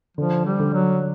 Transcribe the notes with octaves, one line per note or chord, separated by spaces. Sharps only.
D3 F3
G3
D3
F#3